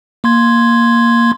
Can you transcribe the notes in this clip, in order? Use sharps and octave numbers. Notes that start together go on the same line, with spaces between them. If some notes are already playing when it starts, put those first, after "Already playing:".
A#3 C6 G#6